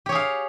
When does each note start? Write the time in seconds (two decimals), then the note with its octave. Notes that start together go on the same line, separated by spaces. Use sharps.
0.06 G4
0.09 C#5
0.12 G#4
0.15 F5